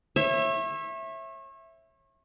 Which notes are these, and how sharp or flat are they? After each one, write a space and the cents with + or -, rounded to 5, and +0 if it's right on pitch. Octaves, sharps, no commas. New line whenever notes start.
C#5 -35 E5 +0